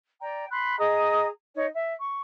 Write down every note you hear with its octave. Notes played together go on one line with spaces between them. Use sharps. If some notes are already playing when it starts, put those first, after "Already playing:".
D5 G5 A#5
B5 C6 F#6
G#4 D#5 A#5 D#6
D#4 C#5
E5
C#6